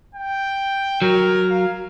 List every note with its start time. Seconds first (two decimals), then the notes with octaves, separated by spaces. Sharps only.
0.15 G5
1.02 F#3 A#4
1.50 F5